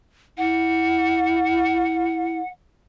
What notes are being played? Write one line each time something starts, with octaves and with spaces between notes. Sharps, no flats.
E4 F#5